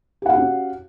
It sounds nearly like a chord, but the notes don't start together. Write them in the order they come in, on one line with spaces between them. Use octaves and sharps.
G4 F#5 F5 F#4 C#4